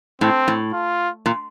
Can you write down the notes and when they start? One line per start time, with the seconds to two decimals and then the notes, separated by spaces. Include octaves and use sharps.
0.21 A2 C4
0.48 A2
0.73 F4
1.26 A#2